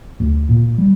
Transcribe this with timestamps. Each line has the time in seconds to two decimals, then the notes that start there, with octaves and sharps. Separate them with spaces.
0.20 D2
0.49 A#2
0.78 G3